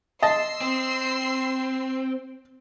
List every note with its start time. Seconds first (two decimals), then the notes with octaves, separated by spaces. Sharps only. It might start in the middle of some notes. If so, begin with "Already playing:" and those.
0.22 D#5 A5 C6 E6 C7
0.62 C4